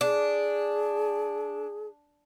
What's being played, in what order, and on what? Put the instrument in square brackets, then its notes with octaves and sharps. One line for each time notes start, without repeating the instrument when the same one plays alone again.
[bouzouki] D4 [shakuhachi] G#4